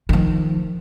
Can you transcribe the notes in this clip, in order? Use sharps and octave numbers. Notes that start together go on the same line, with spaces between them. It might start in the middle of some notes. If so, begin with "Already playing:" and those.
D#3 F3